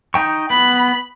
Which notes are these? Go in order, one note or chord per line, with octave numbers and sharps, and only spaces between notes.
D#4 G5 C#6
B3 B5